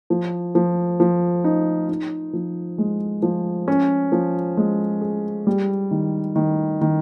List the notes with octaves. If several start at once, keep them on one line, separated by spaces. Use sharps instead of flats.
F3
F3
F3
D#4
D#4
F3
G#3
F3
C#4
F3
G#3
G#4
G3
D#3
D#3
D#3